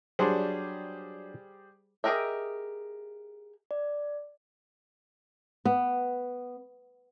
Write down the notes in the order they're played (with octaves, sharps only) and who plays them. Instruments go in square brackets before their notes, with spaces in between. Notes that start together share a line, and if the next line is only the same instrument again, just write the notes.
[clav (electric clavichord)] F#3 D4 D5 [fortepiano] G3 G#4 C5
[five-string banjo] G4 G#4 A#4 D#5 E5
[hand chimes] D5
[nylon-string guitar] B3